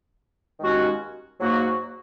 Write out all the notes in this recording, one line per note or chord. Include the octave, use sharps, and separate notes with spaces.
D#2 D#3 G#3 C#4 F#4
G#2 F#3 A#3 F#4